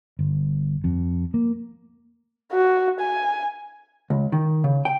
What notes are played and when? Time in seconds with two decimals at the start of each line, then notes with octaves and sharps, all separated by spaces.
0.19 G1
0.84 F2
1.34 A#3
2.52 F#4
3.00 G#5
4.10 C#2
4.32 D#3
4.64 C#3
4.85 G5